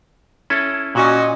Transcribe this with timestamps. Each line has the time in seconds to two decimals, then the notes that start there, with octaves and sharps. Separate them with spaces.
0.50 C#4 E4 A4
0.95 A#2 C#4 F#4 D#5